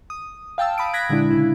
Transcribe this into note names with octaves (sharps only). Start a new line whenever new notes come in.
D#6
F5 G5 A5 E6
F5 B5 D#6 D7
F#6 G#6 A#6 B6 D7
A#2 D3 G#3 D4 E4
C#3 E4